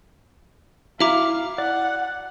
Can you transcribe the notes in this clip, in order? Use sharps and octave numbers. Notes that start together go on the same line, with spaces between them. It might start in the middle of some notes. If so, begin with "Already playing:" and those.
E4 F#4 E5 F5 A#5 D6
D5 F#5